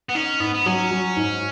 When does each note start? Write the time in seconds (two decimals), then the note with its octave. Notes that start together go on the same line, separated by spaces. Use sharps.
0.09 B3
0.15 C#4 D#4
0.40 G#2 B3
0.54 B3
0.66 F#3 C#4
0.91 F#3
1.16 G#2